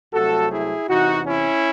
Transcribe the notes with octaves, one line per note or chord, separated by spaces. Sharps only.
C2 C3 F#3 A3 F#4 A4
E4 G#4
E2 C3 E3 D#4 F#4
C#4 E4